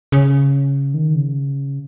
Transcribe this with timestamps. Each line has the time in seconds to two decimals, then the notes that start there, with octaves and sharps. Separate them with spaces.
0.12 C#3
0.94 D#3
1.15 C#3